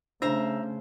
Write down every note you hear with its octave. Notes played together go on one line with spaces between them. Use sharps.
C#3 A3 D4 C5 E5 A#5